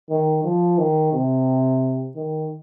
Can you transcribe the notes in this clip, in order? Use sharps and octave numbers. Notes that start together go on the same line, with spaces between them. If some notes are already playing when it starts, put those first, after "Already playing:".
D#3
F3
D#3
C3
D#3